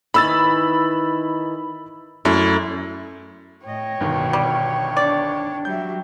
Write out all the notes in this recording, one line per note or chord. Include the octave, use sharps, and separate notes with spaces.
D#3 E3 B5 E6 A6
F#2 A3 E4
A2 C#5 D#5 G5
G1 G2 B2 D#3
G3
D4 D5
F#3 G3 E5 G6